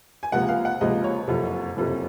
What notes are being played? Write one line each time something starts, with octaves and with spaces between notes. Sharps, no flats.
G#5
C#2 C3 F3 A#3 F#5
F5
F#5
C#2 C3 F3 A#3 D#5
C#5
F#1 F2 C3
F#1 F2 C3